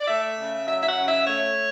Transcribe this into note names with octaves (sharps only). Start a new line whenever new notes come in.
D5
A3 E5
C#3
F#3 E5
E5
F#5
C#3
E5
A3 C#5